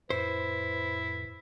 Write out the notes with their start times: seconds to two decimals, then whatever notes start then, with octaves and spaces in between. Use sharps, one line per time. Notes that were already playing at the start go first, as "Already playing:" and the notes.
0.10 F2 A2 E4 B4 C5